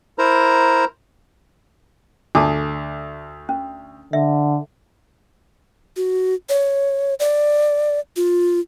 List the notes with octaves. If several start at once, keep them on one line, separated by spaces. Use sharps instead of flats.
E4 A#4 C5 A#5
D2 D4 A4 A5 D6
C#4
D3 E5
F#4
C#5
D5
F4